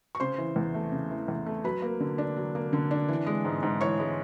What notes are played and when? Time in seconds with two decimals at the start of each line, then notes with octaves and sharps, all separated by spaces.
0.15 C#6
0.20 C#3 C5 C6
0.38 E3
0.56 E2
0.74 A3
0.92 C#3
1.11 E3
1.28 E2
1.46 A3
1.64 F#3 B4 B5
1.82 A#3
2.00 D3
2.18 D4
2.37 F#3
2.55 A#3
2.73 D3
2.91 D4
3.08 E3
3.26 G#3
3.45 G#2
3.63 G#2
3.81 E3 C#5 C#6
3.99 G#3